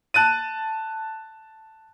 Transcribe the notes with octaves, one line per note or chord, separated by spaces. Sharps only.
A5 F#6 A6 D#7